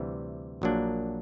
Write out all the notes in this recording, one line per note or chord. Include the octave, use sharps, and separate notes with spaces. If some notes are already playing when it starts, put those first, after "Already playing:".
Already playing: D2 C3 E3 G3
A#1 A#2 F#3 A#3 D4